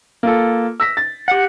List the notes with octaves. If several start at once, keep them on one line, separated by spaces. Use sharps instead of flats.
A#3 F4 A4
E6 A#6 B6
A6
G4 F#5